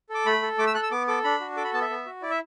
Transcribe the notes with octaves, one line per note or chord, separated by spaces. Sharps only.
A4
D6
A3 B5
A4
A3 D6
E6
A4 F#6
E6
B3 D6
A4 D6
D4 B5
F#4
A4 D6
B5
B3 A5
E5
B3
F#4
E4 D5
E5